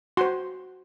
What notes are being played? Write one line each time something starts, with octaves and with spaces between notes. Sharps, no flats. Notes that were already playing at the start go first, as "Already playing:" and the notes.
F#4 C5 C6